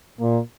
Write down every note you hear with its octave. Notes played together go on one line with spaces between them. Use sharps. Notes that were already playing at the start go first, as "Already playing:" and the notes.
A#2 A#3